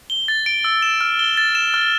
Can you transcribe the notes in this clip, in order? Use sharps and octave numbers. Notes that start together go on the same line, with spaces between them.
G7
A6
D7
E6
E7
F6
G7
A6
E7
F6